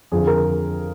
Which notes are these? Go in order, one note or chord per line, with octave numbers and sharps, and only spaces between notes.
F2 D3 F3 G#4
A#4